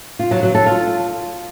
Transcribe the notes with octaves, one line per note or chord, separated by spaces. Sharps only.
F4
F#3
F#3
A4
F4